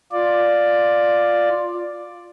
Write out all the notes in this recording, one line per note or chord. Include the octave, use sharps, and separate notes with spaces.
F4 D5